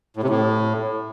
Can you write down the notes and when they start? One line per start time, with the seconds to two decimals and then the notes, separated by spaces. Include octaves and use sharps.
0.16 A2
0.23 C3
0.29 A2